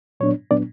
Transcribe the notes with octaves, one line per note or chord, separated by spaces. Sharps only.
A#2 F#3 B3 D4 C#5
A#2 F#3 B3 D4 D5